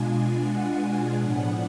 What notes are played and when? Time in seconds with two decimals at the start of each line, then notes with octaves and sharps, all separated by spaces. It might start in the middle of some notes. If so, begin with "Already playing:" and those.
Already playing: B2 G#3 D4 F4 G#5
0.42 F#5
1.19 A2 F3 B3 D4